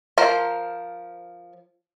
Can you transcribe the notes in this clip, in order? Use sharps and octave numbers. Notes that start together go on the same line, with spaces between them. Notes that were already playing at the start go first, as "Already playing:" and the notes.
F3 A#4 C5